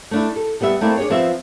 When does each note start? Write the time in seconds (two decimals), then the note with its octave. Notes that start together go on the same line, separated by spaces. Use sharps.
0.11 A3 D4 E4
0.36 A4
0.61 G3 B3 B4 E5
0.81 A3 A#3 C4 E4 D5 E5
0.97 D4 G#4 C#5
1.10 F3 B3 C4 B4 E5